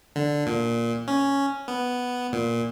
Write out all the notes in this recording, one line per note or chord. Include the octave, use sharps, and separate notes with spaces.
D3
A#2
C#4
B3
A#2